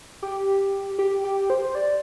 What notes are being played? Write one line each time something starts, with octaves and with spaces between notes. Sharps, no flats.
G4
G4
G4
C5
D5